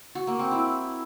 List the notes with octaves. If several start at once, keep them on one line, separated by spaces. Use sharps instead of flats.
F#4
A#3
C4
E4